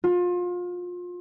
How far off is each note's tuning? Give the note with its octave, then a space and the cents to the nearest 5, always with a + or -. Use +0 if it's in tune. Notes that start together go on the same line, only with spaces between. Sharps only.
F4 +30